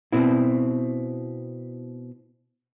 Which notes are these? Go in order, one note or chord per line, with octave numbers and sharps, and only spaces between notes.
B2 C4 E4